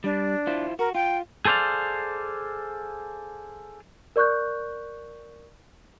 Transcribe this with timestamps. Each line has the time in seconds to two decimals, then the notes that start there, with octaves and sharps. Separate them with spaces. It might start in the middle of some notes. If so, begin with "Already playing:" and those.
0.04 G3 D4
0.47 E4 F4 C5
0.79 F#4 A#4
0.95 F4 G5
1.45 G#4 A4 C5 D5 F5
4.16 A#4 D5 C#6 F#6 G6